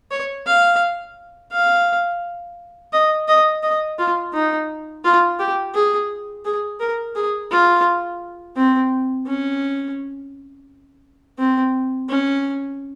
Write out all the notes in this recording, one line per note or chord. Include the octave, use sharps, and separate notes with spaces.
C#5
F5
F5
D#5
D#5
D#5
F4
D#4
F4
G4
G#4
G#4
A#4
G#4
F4
C4
C#4
C4
C#4